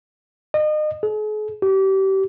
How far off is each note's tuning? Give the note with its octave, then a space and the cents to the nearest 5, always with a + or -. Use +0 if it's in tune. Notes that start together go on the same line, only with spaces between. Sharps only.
D#5 -35
G#4 +45
G4 -30